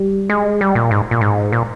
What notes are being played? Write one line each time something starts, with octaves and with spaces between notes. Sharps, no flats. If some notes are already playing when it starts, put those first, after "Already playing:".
Already playing: G3
G#3
G3
A#2
G#2
A#2
G#2
A#2